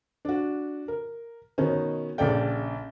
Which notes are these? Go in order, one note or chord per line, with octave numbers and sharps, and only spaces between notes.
D4 F#4
A#4
B2 D#3 C#4
A#1 C#3 A4 D5 G5